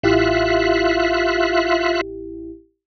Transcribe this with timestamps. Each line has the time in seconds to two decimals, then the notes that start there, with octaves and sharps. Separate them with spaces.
0.03 A1 E4 F4 G4 E5 F#6